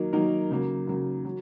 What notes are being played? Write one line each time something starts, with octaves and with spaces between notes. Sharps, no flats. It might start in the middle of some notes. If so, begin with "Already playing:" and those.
Already playing: D#3 F#3 A#3 D#4 A#4
D#3 F#3 A#3 D#4 A#4
C#3 F#3 A#3
C#3 F#3 A#3
F#3